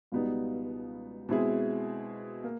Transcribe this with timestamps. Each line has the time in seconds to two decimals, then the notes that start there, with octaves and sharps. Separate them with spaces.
0.12 C#2 B2 G3 B3 D#4
1.29 B2 G#3 C4 E4 G#4
2.44 A#3